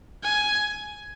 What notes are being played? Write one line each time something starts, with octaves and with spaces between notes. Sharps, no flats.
G#5